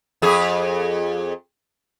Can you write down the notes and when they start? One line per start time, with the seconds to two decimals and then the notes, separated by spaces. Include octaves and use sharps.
0.22 F2 G#4